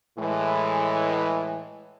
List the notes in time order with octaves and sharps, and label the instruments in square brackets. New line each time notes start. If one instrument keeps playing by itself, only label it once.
[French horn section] A2 E3 G#3